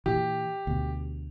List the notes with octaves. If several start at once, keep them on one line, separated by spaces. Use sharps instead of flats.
A#2 E3 G4
D2 B2